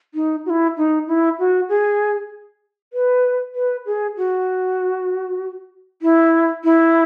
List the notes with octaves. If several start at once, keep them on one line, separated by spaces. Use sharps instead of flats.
D#4
F#4
E4
D#4
E4
F#4
G#4
B4
B4
G#4
F#4
E4
E4